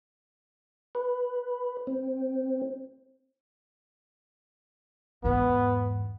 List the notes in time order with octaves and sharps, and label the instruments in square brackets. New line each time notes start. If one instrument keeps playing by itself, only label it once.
[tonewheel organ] B4
C4
[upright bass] E2 G#2 [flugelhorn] B3